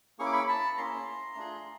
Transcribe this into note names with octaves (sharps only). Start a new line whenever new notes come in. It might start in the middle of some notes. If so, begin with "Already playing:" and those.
A#3 C#4 E4 G#4 C#6
D6
B5 C#6
A5 B5
A#3 C#4 E4 G#4 A#5 C6
A3 D4 F4 G#4